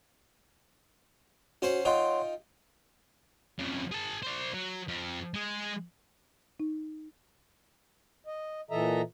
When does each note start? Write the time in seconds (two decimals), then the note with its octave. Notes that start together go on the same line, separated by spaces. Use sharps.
1.62 C#4 F#4 C5 F#5
1.85 D#4 F4 C#5 F#5 G5 C6
3.59 F2 C#3
3.92 G#4 A5
4.23 C5 D5
4.54 F#3
4.88 F2
5.34 G#3 G#4
6.60 D#4
8.27 D#5
8.71 A#2 E3 A4 D#5 E5 A#5